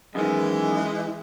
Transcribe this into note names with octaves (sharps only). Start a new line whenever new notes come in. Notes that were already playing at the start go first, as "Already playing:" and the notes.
F#2 D#3 E3 G#3